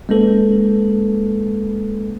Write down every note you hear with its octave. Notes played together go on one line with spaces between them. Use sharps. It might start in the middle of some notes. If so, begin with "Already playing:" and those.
G#3 A#3 C#4 A4 B4